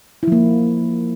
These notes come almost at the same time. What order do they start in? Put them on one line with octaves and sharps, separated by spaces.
E4 F3 A#3